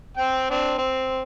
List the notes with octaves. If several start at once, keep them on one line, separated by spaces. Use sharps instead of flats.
C4 G5
C4 D4
C4